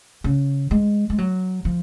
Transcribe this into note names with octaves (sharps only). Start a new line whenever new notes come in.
C#3
G#3
G#3
F#3
F3